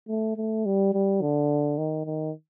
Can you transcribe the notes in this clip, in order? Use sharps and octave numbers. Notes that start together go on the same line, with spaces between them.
A3
A3
G3
G3
D3
D#3
D#3